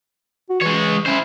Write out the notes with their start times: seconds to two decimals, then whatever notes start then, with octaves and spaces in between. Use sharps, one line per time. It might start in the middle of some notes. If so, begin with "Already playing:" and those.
0.49 F#4
0.61 E3 G#3 C#5
1.06 C#4 E4 C5